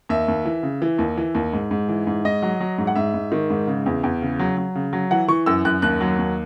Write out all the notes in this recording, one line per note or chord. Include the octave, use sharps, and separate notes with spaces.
D#2 E5
D#2
E3
C#3
E3
D#2
E3
D#2
G#2
G#2
E3
G#2
G#2 D#5
F#3
F#3
G#2
F#5
G#2 E5
G#2
D#3
G#2
C#3
E2
E2
C#3
F#3
F#3
C#3
F#3
E3 F#5
E3 C#6
F#2 E6
F#2 F#6
D#2 F#6
F#3
D#2